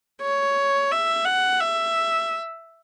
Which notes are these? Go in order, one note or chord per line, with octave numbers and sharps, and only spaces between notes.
C#5
E5
F#5
E5